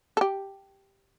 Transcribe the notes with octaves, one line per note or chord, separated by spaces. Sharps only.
A4
G4